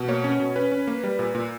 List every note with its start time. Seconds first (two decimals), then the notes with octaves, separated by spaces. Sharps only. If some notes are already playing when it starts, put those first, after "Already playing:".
Already playing: B2
0.08 A#3 C#5
0.24 C#4
0.39 B2
0.56 C#4 B4
0.72 C#4
0.87 A#3
1.04 G3
1.19 A#2
1.35 A#2